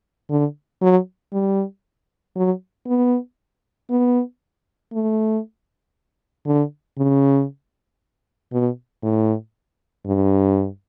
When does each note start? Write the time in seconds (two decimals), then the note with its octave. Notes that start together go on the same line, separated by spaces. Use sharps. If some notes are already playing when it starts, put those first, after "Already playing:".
0.30 D3
0.82 F#3
1.33 G3
2.36 F#3
2.87 B3
3.90 B3
4.93 A3
6.46 D3
6.98 C#3
8.53 B2
9.03 A2
10.06 G2